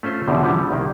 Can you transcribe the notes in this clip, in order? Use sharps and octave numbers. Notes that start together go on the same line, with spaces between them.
A3 C#4 F4 C5
E2 B2 D3 D#3 F3
D3 E3 F3 G3 B3 C#4
C2 D#3 A#3